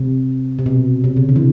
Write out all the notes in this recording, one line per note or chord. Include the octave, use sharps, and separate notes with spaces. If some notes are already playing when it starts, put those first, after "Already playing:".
Already playing: C3
C3
B2
C3
C#3
D3
E3